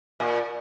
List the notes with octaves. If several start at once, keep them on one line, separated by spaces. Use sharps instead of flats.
A#2